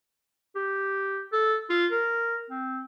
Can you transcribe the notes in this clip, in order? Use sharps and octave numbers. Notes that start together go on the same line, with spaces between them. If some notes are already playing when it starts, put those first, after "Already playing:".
G4
A4
F4
A#4
C4